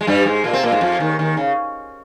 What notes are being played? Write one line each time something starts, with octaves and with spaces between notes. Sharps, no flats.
G#3
G2 G3
G#2 G#3
A#2 A#3
C3 C4
A#2 A#3
G#2 G#3
F2 F3
D#2 D#3
D#2 D#3
C#3